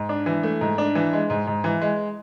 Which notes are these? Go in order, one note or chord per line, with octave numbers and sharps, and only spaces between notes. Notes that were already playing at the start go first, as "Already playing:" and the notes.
Already playing: G#2
D4
E3
A3
G#2
D4
E3
G#3
G#2
G#2
E3
G#3